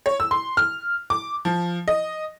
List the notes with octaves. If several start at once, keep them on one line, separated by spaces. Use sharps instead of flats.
C#5
E6
C6
F6
D6
F3
D#5